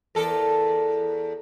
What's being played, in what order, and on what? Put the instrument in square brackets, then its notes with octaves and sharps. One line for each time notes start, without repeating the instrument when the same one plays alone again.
[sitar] E2 A4 A#4